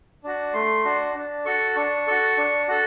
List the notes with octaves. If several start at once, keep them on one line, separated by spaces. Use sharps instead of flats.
D4 F#4
A3 C6
D4 F#4
D4
F#4 A4 C#6
D4 C#6
F#4 A4
D4
F#4 A4